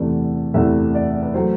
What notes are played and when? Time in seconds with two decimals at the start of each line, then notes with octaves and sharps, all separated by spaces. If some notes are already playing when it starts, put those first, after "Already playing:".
Already playing: E2 C3 E3 A3 D5
0.54 E2 C3 E3 A3 E5
0.95 D5
1.23 B4
1.34 F#3 A3 C5